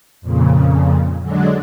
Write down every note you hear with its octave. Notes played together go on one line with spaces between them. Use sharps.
F2 A#2 C#3
D3 F#3 G#3 D4